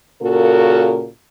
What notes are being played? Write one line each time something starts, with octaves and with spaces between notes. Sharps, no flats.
A#2 C#3 F#4 A4 A#4